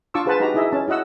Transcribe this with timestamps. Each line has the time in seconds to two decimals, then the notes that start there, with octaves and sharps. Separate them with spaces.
0.14 D4 F4 A5 C#6 D6 E6
0.26 F4 G#4 B4 C5 F#5 A5
0.40 D#4 F#4 G4 A#5
0.54 D#4 E4 G#4 D#5 E5
0.72 C#4 A5
0.88 E4 F#4 D#5 F#5 E6